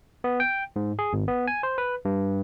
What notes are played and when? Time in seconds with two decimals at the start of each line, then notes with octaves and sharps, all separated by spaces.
0.24 B3
0.40 G5
0.76 G#2
0.99 G#4
1.13 G#1
1.28 B3
1.47 G#5
1.63 C5
1.78 B4
2.05 G2